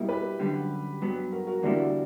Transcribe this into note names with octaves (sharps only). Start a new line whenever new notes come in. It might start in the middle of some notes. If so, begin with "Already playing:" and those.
Already playing: B2 G3 A#3 E4
G4 B4
F#2 D3 G3
G2 F#3 B3
F#4 A#4
F#4 A#4
E2 D3 G3 A#3 D4 E4 F#4